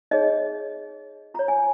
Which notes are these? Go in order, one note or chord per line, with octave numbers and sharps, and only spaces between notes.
D#4 G#4 C#5 D#5
F4 C#5 A#5
G#5